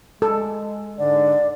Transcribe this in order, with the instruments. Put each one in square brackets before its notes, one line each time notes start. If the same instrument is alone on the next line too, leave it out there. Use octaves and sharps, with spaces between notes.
[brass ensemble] G#3 [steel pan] A4
[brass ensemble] G#2 D3 [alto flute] D5